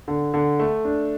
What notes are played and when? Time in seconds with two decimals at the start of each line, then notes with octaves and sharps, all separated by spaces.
0.08 D3
0.34 D3
0.59 A3
0.85 D4